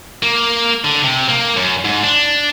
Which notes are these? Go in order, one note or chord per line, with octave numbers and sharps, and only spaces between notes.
A#3
D3
C3
A#3
F#2
G#2
D4